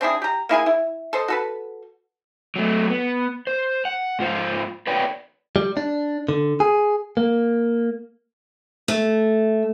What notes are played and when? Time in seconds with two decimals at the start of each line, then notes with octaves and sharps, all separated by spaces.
0.01 C4 D4 E4 G#4
0.22 G4 A#5
0.49 A#3 E4 G#4 G#5
0.66 E4
1.13 A4 C5 D#5
1.28 F#4 A4 B4
2.56 F#3 A3
2.90 B3
3.47 C5
3.85 F#5
4.19 G#2 F4 C5 F5
4.87 B4 C#5 D5 G5
5.56 G3
5.77 D4
6.29 D3
6.60 G#4
7.17 A#3
8.88 A3